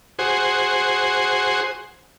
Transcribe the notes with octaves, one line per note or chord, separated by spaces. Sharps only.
F#4 G#4 C5